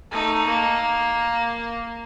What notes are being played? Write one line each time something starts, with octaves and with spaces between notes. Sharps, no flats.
A3 D#4
A#3